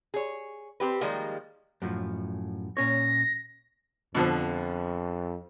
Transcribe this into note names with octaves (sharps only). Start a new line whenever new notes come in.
G#4 C#5
C4 G4 B4
D#3 F3 G3 G#3 A#3
F#2 A2 F3
A#2 C#4 C#5 A#6
F2 B2 D3 F3